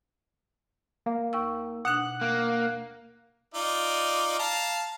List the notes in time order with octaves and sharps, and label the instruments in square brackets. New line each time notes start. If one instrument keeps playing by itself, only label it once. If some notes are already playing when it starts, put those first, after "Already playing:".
[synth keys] A#3
[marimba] D#2 C#6 E6
[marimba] B2 D4 [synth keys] F#5 F#6
[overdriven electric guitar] A#3
[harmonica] D#4 F4 D5
F5 A5 A#5